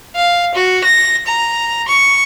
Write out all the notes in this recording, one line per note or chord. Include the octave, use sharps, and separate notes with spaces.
F5
F#4
A#6
A#5
C#6